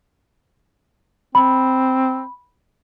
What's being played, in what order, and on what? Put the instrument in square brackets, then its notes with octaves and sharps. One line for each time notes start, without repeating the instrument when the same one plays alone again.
[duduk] C4 [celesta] B5